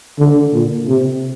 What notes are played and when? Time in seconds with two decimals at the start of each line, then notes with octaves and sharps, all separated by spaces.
0.19 D3
0.53 A#2
0.88 C3